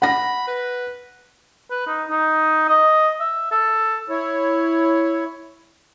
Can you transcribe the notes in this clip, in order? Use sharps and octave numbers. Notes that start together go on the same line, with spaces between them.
F#5 B5 A#6
B4
B4
D#4
D#4
D#5
E5
A4
E4 C#5